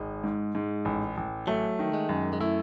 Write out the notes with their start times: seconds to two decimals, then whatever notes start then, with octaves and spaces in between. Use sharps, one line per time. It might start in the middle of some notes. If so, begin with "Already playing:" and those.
Already playing: G#1 G#3
0.24 G#2
0.55 G#2
0.85 A1
1.17 A1
1.47 F#3 A3
1.79 D#3
1.94 G#3
2.09 F#2
2.33 G#3
2.41 A3 E4